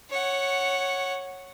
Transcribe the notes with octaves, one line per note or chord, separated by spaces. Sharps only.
C#5 F#5